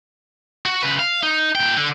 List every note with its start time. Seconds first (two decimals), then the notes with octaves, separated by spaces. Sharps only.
0.66 F#4
0.83 C#3 B4
0.99 F5
1.23 D#4
1.55 A#2 G5
1.77 D3